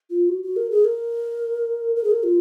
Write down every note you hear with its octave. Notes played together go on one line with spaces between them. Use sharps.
F4
F#4
F#4
A#4
G#4
A#4
A#4
G#4
A#4
F4